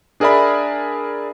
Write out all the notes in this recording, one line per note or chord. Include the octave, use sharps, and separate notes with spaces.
D4 G#4 A#4 D5 E5 B5